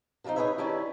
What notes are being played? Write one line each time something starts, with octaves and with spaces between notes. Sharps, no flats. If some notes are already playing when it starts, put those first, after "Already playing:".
D3 F3 F#3 C4 D#4
D#4 G#4 A4 B4 C#5 E5
D#3 C#4 D4 E4 G4